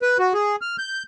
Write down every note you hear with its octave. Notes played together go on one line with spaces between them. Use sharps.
B4
F#4
G#4
F6
G6